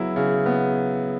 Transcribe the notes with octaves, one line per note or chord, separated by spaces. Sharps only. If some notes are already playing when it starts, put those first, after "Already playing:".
Already playing: C#3 F#3 B3 E4
C#3
B3